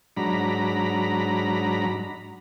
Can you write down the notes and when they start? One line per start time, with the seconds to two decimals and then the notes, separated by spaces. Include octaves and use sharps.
0.17 G#2 F#3 D4 A#5 B5